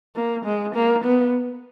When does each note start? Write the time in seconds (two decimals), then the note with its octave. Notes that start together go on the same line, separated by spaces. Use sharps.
0.15 A#3
0.45 G#3
0.75 A#3
1.04 B3